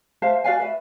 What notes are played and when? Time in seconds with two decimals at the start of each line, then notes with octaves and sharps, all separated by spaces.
0.22 C5 E5 F5 A5
0.44 F#4 D5 F5 G#5
0.59 B4 E5